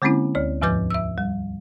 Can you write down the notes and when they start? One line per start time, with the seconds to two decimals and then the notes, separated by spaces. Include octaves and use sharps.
0.02 D3 G#3 A#3 C4 C#4 E4
0.35 D2 C#5
0.61 E2 G#2 F3 B4 D6 G6
0.90 E5 E6
1.18 G3